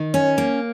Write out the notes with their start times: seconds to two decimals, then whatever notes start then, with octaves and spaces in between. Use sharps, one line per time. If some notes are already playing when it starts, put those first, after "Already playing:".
Already playing: D#3
0.14 C#4
0.38 A#3